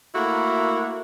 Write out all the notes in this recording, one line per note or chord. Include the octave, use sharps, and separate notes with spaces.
A3 A#3 E4 F#4 A#4